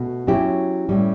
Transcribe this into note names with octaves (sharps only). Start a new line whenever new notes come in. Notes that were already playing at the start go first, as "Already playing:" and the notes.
Already playing: B2 A3
F#3 C#4 E4 G4
A2 G3 C#4